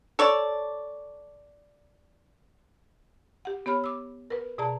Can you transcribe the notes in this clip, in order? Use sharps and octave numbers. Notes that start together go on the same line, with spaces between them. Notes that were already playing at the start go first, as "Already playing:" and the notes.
A4 C#5 D5
G4 F#5
B3 G4 C#5 B5 F6
D6 E6
A#4 B4
B2 G#4 D5 A5 A#5